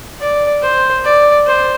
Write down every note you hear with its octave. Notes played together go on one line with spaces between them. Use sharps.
D5
C5
D5
C5